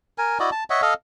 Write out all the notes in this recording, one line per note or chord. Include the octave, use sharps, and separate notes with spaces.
A#4 G#5
E4 F#4 D5 D#5
A5
C#5 D#5 E5 F#5
A4 D#5 F5